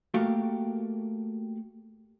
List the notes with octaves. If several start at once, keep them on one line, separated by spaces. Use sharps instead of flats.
A3 A#3 F#4 G4 A#4 F5